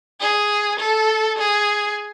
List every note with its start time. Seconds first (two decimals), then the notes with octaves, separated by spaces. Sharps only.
0.20 G#4
0.79 A4
1.38 G#4